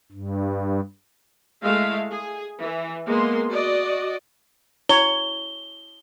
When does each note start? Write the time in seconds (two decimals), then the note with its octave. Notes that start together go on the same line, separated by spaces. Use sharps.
0.12 G2
1.62 G#3 A3 E4 F5
2.11 G#4
2.59 E3
3.07 G#3 A#3 B3 C6
3.51 F#4 D5 D#5
4.89 E4 C#5 G7